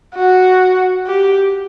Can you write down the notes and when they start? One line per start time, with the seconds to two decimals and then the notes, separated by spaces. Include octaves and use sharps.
0.15 F#4
1.07 G4